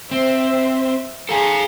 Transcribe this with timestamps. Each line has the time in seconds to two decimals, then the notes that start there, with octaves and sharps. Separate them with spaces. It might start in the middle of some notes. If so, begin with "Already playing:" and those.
0.11 C4 C5 E5
1.29 G#4 A4 F5 G#5 A#5